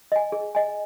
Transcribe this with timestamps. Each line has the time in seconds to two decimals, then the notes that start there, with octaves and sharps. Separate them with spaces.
0.12 D#5 G#5
0.32 G#4
0.55 D#5 G#5